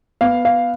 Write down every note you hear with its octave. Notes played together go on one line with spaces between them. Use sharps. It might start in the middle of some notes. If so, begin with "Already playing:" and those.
B3 F5
F5